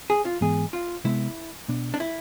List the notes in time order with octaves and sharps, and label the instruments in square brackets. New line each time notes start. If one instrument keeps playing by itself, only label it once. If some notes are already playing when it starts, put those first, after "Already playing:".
[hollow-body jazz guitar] G#4
F4
[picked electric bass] G#2 E3 B3 [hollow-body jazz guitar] G#4
[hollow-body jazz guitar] F4
[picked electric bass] C3 G#3 B3 [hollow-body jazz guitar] E4
[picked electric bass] B2 B3 D4
[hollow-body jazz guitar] D4
E4